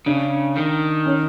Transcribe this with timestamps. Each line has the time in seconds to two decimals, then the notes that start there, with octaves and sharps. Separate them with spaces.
0.06 C#3 D4
0.56 D#3
1.06 C#4